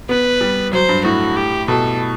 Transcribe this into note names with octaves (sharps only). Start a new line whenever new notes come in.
B3 B4
G3
F#3 C5
G2
A2 F#4
G4
B2 A4